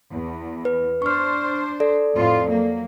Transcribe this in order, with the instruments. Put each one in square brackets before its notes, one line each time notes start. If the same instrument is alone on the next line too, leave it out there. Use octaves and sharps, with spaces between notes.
[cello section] E2
[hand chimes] B4
[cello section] D4 C5 [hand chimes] C#6 F6
[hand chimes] A4 D5
[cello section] F2 A2 F4
F#3 A#3